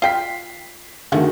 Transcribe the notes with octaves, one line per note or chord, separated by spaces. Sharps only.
F4 G5 B6 C7
D3 D#3 F3 G#3 A3 F#4